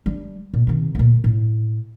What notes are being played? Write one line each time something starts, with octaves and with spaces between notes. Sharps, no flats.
G3 D4
A#2
C3 D#3
D2 A#2
A2